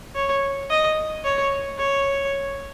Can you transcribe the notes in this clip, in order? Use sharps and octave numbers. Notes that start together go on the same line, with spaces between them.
C#5
D#5
C#5
C#5